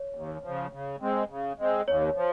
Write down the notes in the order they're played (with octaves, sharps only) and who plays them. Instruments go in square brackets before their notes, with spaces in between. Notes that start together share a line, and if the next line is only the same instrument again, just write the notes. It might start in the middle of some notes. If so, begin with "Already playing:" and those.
Already playing: [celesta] C#5
[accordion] D#2
C#3 F3
C#3
G#3 C4
C#3
G#3 C4
[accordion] D#2 [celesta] C#5
[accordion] F3